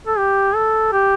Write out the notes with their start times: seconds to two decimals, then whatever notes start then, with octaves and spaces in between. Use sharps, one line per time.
0.07 A4
0.18 G4
0.55 A4
0.93 G4